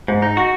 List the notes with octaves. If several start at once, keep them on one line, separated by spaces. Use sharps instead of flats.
G#2
D#4
F#4